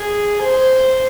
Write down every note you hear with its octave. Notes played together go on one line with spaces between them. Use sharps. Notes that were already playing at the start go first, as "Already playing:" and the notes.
Already playing: G#4
C5